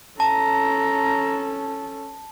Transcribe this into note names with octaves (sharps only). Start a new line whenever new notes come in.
C#4 A4 A5 A#5